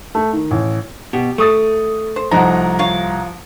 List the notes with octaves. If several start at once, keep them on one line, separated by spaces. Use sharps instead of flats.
A3
D#3
A1
B2 G4
A3 C#6 D#6 A6
C5
C2 F3 D#4 F#5 A#5
F4 C#5 F5